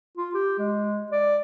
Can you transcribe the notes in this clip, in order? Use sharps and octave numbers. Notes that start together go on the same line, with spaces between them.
F4
G4
G#3
D5